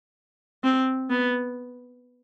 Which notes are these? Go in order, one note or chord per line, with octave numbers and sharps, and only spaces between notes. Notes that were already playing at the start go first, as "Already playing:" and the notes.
C4
B3